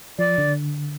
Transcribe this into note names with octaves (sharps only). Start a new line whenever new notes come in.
F3 D5
D3